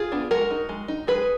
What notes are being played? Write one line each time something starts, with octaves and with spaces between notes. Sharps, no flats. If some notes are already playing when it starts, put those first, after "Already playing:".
Already playing: F4 G#4
B3 D4
G#3 F#4 A#4
D#4
G#3
D#4
G#3 G#4 B4